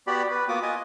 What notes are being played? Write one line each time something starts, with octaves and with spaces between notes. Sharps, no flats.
B3 F#4 G4 D5 B5
B4
A#3 B3 F4 F#4 D6 D#6
F4 D#5 G#5